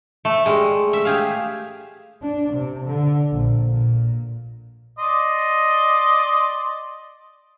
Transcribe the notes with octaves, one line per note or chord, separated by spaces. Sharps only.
A3
G3 G#3
E5
G4 G#4 F5
D4
C3
D3
A#1
A#2
D5 D#5 C6